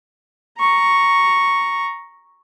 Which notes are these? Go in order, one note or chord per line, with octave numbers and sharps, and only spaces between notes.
A#5 C#6